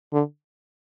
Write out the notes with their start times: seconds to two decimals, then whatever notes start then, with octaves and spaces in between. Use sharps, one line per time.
0.13 D3